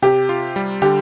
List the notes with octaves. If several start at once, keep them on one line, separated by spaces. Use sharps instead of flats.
C3 G4
F4
G3
D3 G4